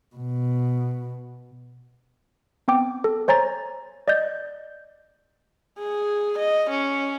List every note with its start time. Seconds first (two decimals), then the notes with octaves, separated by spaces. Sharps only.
0.16 B2
2.68 B3 C4 G5 D6
3.04 A4
3.28 C5 C#5 G#5 A#5 A6
4.08 D5 D#5 G6 A6
5.79 G#4
6.38 D#5
6.70 C#4